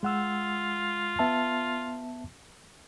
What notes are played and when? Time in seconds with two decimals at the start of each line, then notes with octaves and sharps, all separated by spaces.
0.03 G#3 F4 F#5 E6
1.19 B3 E5 A5